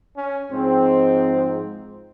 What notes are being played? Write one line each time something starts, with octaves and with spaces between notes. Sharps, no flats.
C#4
G#2 F3 G#3 C4